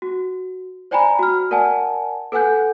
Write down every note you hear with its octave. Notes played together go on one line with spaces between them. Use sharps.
F#4
C5 D5 G5 G#5 A#5 B5
F#4 F6
A#4 D5 F#5 G#5 A5
A4 B4 F#5 G#5 F#6 G6